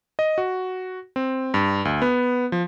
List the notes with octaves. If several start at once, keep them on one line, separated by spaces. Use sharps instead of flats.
D#5
F#4
C4
G2
D2
B3
F3